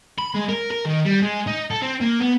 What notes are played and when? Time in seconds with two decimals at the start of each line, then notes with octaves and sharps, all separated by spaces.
0.18 B5
0.34 G#3
0.49 A#4
0.71 A#4
0.85 D#3
1.05 G3
1.22 G#3
1.47 D#4
1.70 A4
1.82 C4
2.01 A#3
2.20 B3